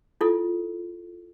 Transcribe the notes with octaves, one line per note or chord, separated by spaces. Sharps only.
E4 F4 A4